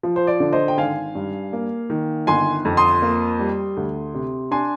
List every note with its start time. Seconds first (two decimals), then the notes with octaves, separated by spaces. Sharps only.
0.03 F3
0.16 C5
0.27 D5
0.40 D3
0.53 C5 D#5
0.68 G5
0.78 G#1 F5 G#5
1.15 G2
1.53 A#3
1.90 D#3
2.27 G1 G#5 C6
2.65 F2
2.77 C6 D#6
3.02 A#3
3.39 G3
3.77 D2
4.14 C3
4.51 D4 G#5 C6